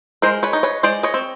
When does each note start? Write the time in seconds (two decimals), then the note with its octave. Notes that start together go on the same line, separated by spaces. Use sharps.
0.22 G#3 A#4 C5
0.43 B4 C#5
0.53 D#4
0.63 B4 C#5
0.83 G#3 C5 D5
1.03 C#5 D#5
1.14 C4